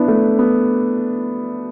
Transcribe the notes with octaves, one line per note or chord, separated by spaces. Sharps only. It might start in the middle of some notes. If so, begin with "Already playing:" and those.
Already playing: B3 D4 E4
A3
B3